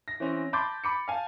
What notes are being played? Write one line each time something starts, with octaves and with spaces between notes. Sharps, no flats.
A#6
E3 C4 C#4
A5 B5 C6 D6 G6 A6
B5 D6 C#7
F5 G#5 A5